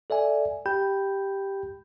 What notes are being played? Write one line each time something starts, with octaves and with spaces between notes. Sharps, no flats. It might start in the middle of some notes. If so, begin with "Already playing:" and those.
A4 D5 E5 G#5
G4 G5 B5 G6